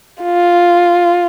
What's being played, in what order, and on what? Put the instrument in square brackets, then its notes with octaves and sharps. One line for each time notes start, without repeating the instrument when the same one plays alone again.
[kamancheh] F4